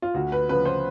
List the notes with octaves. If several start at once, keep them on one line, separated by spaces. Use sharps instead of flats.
F4
D2 F#4
B4
C#3 F3 B4
C5